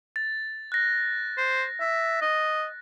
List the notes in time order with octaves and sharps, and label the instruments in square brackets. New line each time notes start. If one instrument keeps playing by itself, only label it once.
[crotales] A6
F#6 A#6
[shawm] C5
E5
D#5